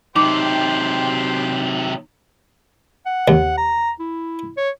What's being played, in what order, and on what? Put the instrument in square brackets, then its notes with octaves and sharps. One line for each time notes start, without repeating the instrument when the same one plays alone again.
[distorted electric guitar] C3 F#3 [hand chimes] D#4 [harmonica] G4 C5 [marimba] D6
[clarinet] F#5
[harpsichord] D#2
[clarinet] A#5
E4
C#5